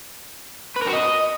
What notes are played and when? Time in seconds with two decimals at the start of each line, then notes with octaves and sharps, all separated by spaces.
0.76 B4
0.82 A#4
0.88 F#4
0.93 D#5